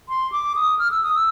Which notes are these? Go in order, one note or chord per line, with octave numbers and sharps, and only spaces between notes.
C6
D6
D#6
F6
E6
D#6
E6